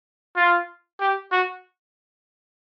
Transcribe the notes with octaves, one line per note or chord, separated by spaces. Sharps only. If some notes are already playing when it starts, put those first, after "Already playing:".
F4
G4
F#4